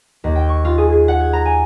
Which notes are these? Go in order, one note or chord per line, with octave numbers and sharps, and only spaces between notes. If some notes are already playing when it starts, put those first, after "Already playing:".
D#2
G5
C#6
F4
G#4
G#4
F#5
G#6
A#5
G#5